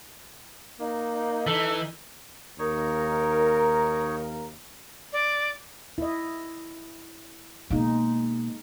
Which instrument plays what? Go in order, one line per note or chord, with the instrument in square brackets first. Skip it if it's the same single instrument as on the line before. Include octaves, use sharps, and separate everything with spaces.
[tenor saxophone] A#3 [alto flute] D#4
[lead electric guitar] E3 [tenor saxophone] A4
[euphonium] D#2 [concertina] D#4 C#5 [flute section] A#4
[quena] D5
[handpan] E4 D#5
[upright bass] B2 A#3 [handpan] G#3 D#4